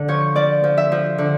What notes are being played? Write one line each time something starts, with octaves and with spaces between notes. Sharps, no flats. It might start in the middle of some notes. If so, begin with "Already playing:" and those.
Already playing: D3
F3 C#5
F3 D5
F3
E5
F3
D3